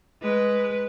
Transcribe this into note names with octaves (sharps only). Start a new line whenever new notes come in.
G#3 B4